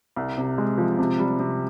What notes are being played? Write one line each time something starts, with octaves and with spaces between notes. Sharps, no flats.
C2
C3
G#3
F3
C3
G3
C3